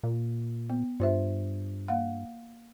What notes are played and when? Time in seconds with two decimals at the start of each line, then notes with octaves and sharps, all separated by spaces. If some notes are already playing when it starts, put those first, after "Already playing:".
0.03 A#2
0.70 B3
1.00 G2 F4 C5 E5
1.88 A#3 F5 F#5